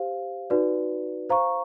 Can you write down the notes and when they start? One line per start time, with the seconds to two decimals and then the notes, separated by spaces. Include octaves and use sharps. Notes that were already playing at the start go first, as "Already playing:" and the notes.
Already playing: G4 C5 F5
0.50 D#4 F#4 B4 D5
1.29 C5 F5 A#5 C#6